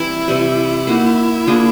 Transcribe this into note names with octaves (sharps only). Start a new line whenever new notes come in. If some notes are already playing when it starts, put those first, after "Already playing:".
Already playing: E3 G3 C4 E4
C3 E3 G3
A#3 D#4 F#4
A#3 D4 F4 G#4